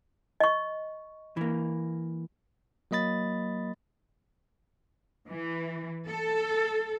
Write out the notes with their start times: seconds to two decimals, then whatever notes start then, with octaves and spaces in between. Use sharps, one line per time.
0.40 D#5 C#6
1.37 E3 A#3
2.91 F#3 A#3 D#5 B5 A6
5.29 E3
6.08 A4